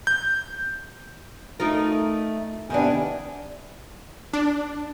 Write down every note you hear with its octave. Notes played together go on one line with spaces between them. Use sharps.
G6
A3 D#4 F4 A#4
C3 D#3 B3 D4 G#5
D4